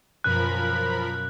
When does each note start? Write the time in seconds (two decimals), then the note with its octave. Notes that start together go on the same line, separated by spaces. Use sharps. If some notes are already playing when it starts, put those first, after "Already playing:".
0.24 F#2 B2 F3 C#4 A#4 B5 F#6